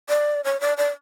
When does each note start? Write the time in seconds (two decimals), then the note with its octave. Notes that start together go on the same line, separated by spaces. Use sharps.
0.09 D5
0.44 C#5
0.61 D5
0.77 D5